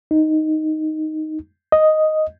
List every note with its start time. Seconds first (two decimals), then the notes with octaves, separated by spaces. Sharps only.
0.11 D#4
1.72 D#5